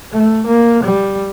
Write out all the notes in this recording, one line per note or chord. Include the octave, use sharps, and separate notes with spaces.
A3
A#3
G3